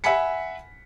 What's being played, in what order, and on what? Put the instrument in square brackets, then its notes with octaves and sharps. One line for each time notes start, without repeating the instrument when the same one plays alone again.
[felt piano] E5 F#5 G#5 B5 B6 C#7